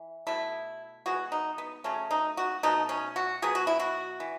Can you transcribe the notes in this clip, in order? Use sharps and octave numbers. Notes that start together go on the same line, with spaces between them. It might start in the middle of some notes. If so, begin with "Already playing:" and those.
Already playing: E3
B2 A3 E4
E3 G#3 B3 F#4
D#4
B3
C#3 F#3 A3 C#4
D#4
F#4
B2 A3 D#4
C#4
F#4
B2 F#3 B3 G#4
F#4
E4
F#4
E3